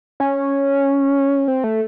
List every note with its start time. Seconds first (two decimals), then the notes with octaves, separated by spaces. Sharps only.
0.20 C#4
1.48 C4
1.64 A3